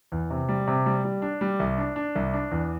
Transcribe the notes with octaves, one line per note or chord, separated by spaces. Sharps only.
E2
C3
G3
C3
G3
G3
D4
G3
C2
D4
D4
C2
D4
E2